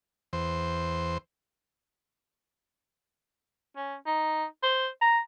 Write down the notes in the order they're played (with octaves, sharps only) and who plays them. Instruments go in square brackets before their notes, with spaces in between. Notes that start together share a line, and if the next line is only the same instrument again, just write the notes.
[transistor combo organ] E2 C5
[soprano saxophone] C#4
D#4
C5
A#5